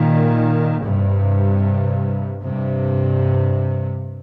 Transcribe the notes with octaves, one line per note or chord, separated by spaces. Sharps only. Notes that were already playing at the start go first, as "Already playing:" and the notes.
Already playing: A#2 D#3
G2 C3
G2 C3